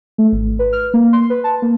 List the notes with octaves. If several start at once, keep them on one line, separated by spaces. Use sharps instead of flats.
A3
G#1
B4
F6
A#3
C6
B4
A5
A#3